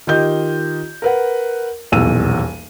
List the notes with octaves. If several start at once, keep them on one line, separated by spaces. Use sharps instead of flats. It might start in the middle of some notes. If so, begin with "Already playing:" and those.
D#3 F4 G4 D#5 G6
A#4 B4 F#5
D#1 B1 E2 E6 D#7